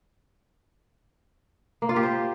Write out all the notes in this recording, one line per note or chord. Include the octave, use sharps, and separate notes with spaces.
A#3
F4
G4
C5